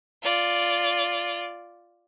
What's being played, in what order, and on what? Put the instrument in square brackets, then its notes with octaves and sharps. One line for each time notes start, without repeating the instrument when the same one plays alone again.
[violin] F4 D5